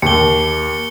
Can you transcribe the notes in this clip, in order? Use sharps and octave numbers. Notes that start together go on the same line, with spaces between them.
D#2 C#7 G7